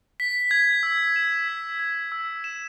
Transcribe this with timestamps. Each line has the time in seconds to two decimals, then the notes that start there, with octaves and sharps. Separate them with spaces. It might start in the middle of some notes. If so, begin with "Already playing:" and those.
0.20 B6
0.51 G#6
0.83 E6
1.16 E7
1.48 B6
1.80 G#6
2.12 E6
2.44 E7